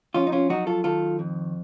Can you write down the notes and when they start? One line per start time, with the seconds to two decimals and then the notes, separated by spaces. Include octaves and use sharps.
0.14 F2 C#4 F4
0.27 D#4
0.32 C#4 F4
0.50 F#3 D#4 F#4
0.67 F4 A4
0.84 D#3 F4 A4
1.19 F2